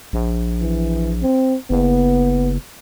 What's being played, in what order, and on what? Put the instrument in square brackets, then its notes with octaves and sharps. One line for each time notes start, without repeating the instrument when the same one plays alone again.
[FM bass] A#1
[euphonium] E3
C4
[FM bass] F#1 [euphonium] B3